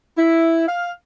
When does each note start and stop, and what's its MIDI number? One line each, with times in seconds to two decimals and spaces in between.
0.17 0.63 64
0.68 0.90 77